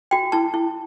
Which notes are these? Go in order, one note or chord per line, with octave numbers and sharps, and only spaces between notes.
F#4 G5
E4 A5
E4